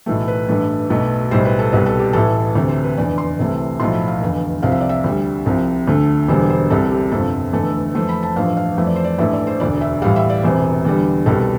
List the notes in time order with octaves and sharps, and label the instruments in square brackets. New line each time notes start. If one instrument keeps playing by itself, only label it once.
[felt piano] B1 A2 E3 A3
B4
A1 G2 E3 A3
B1 B2 A3
B1 A2 G3 C5
B4
A4
C2 B2 G3 B4
A4
G4
A1 A2 E3 A4
D2 C3 E3 A4
C5
B4
F1 E2 D3 D5
C6
C2 C3 E3 A3
B1 A2 F3 A3 C6
B5
F5
F1 E2 D3
C2 C3 F3 F5
E5
D5
E5
D2 D3 G3
C2 C3 F3
D2 D3 A3
E1 E2 D3 G3 C5
C5
C2 C3 G3 A4
G4
G1 F2 C3 F3 A4
F1 E2 D3 A3 A4
F2 E3 A3 C5
B5
A5
A1 G2 F3 A3 F5
F5
F2 E3 A3 E5
D5
C5
D5
A1 G2 E3 A3 E5
D5
C5
E1 D2 D3 D5
E5
A1 A2 G3 F5
E5
D5
E1 E2 C3 C5
E2 D3 G3
C2 B2 G3 A4